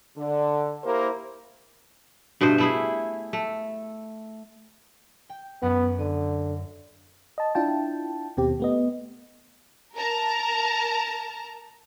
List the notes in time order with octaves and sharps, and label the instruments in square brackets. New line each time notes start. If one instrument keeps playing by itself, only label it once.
[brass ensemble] D3
A#3 E4 G4 A#4 C5
[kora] G2 B2 A3 C5
A3 E4 G#4
A3
[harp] G5
[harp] F#2 F#4 [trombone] B3
[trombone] D3 [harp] D#7
[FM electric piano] D#5 A5
D4 E4 F4 G5 A5
D#2 B2 C4 G4
A3 B3 D#5
[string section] A#4 A5 A#5